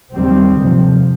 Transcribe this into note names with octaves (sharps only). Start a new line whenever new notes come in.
D#2 D#3 G3 C4
F2 C3 F3